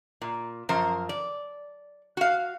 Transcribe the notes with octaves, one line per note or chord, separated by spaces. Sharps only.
A#2
F#2 F3 A#4 C5
D5
F#4 F5